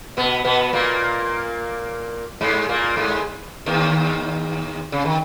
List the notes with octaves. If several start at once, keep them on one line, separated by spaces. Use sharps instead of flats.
B2 B3
B2 B3
A#2 A#3
G#2 G#3
A#2 A#3
G#2 G#3
D#2 D#3
C#3
D#3